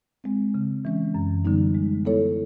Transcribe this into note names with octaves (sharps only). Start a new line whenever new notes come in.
G#3 C4
C#3
E3 G#3 C#4
F#2
D3 G3 B3 D#4
G#3
B3 E4 A4 C#5